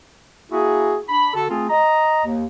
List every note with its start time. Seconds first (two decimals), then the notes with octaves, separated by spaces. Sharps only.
0.52 A#3 E4 F#4 G#4
1.09 D4 B5
1.34 D3 F#4 A4
1.50 A3 C4 F4 G#4
1.70 D#5 A#5
2.24 D#2